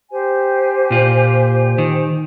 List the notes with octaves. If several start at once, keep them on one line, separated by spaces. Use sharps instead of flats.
G4 C5 G#5
A#2 F4
D#3